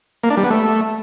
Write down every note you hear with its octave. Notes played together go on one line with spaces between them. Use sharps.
A#3
D4
G3
B3
A3